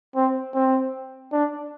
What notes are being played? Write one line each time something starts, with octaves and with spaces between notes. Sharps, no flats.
C4
C4
D4